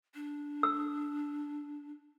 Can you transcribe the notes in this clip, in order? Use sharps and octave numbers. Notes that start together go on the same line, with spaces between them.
D4
E6